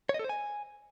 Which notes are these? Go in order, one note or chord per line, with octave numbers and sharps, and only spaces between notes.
C#5
D#5
A4
C5
G#5